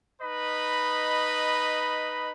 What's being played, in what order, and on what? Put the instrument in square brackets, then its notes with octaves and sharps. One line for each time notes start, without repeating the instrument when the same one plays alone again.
[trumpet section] D#4 B4 D#5 B5